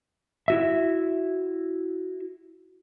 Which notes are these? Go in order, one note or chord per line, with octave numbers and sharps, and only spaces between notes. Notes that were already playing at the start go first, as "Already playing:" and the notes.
E4 F#4 E5